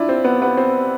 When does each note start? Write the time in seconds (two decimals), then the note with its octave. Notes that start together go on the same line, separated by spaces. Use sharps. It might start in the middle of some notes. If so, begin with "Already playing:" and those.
Already playing: D4 E4 F4
0.09 C4
0.24 B3
0.42 B3
0.57 C4